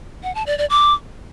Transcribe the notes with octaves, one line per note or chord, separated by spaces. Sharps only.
F#5
A5
D5
D5
D6